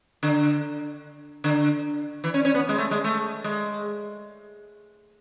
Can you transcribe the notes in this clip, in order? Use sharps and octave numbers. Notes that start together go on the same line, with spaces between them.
D3
D3
E3
C#4
C#4
B3
G#3
A3
G#3
A3
G#3